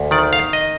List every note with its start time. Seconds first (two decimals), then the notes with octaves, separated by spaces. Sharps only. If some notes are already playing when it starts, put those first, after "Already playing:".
Already playing: D2
0.11 D#3 D5
0.33 F5
0.53 D#5